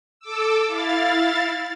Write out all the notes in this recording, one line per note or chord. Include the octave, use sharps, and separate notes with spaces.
A4 D6 E6
E4 F5 A6